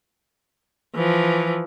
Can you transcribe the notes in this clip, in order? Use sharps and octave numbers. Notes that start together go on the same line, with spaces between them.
E3 F3